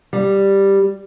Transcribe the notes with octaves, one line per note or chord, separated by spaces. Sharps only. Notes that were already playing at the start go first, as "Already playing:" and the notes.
G3